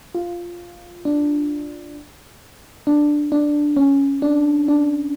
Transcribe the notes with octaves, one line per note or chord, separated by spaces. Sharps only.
F4
D4
D4
D4
C#4
D4
D4